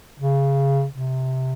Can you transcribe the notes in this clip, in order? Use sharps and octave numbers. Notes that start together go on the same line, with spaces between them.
C#3
C3